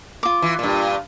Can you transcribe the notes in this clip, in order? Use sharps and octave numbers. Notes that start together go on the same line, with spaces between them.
F4 D6
E3
G2 A#2